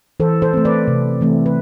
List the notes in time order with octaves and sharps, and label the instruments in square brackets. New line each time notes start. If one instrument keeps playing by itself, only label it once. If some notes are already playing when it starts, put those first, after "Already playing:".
[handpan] E3 A4 C5
A4 C5
A3 C4
B4 D5
C3
E3 A3 C4
B4